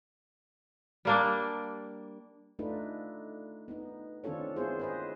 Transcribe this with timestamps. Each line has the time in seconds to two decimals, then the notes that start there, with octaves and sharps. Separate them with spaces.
1.05 G3 A#3 D4
2.59 A3 D4 D#4 F4 B4
3.68 B3 D#4
4.24 D#3 C4 D4 F4 A4 C#5
4.56 B3 C4 E4 F4 G#4 C5
4.79 B4 C5 D#5